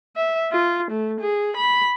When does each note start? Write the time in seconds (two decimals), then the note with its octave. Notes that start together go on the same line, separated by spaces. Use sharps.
0.17 E5
0.52 F4
0.91 A3
1.20 G#4
1.57 B5